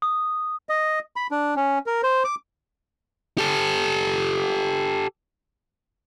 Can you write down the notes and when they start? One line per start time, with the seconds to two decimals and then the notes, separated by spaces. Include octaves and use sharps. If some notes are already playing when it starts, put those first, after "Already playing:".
0.02 D#6
0.69 D#5
1.16 B5
1.31 D4
1.56 C#4
1.86 A#4
2.03 C5
2.24 D6
3.38 G4 A4